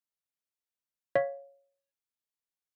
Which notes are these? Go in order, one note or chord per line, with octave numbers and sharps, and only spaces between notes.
C#5 F5 B6